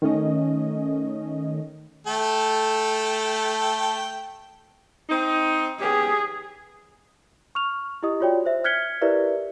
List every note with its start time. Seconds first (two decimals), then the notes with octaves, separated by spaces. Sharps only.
0.02 D#3 A3 C#4 D#5
2.07 A3 A4 G5
5.09 C4 D#4
5.81 B3 C#4 G4 G#4
7.55 C#6 F6 F7
8.03 E4 G4 D#5 D#6
8.20 F4 F#4 C#5 D5 G5
8.46 C5 E5
8.64 F6 F#6 G#6 B6 C#7 G7
9.01 E4 G4 A#4 B4 D5 E5